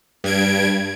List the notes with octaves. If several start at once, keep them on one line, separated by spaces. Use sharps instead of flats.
G2 G#6 D7